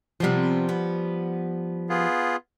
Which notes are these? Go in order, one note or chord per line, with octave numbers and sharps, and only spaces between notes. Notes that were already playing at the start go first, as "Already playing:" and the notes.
C3 F3 G3 B3 C4
B3
B3 F4 G#4